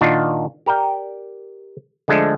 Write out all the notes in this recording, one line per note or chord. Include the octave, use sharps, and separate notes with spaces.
A#2 D#3 D4 F4 F#4
G4 A#4 D5 G5
D3 F3 G#3 A3 D4 A4